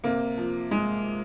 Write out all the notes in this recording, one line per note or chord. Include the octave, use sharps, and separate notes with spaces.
C3 A#3
F3
G#3